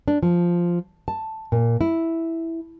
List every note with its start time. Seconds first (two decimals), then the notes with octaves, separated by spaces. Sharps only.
0.08 D4
0.23 F3
1.08 A5
1.52 A#2
1.81 E4